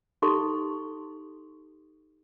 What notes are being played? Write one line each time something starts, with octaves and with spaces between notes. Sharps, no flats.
D#4 G4 A4 C6 C#6